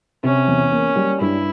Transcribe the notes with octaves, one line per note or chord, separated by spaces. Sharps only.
C3 C#4
E2
A#3
G3
G2 E4